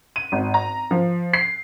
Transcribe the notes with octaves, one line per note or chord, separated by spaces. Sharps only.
D#7
G#1
A#5
F3
C7